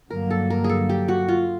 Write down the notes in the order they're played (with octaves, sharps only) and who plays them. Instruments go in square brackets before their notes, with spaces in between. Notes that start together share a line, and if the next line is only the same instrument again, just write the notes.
[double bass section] G2 D3 F#3 A#3 [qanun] A#4
[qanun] A4
A#4
G#4
A4
G4
F#4
F4